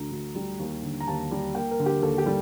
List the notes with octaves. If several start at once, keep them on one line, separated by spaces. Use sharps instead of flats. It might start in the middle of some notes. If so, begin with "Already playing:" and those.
Already playing: D2 D3 A#5
D2
G3
D#2
D3
A#5
D#2 A5
G3
A#3 G5
A#4
D3
G4
D#2 A4
G4
G3